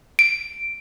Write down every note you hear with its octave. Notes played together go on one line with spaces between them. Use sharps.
D7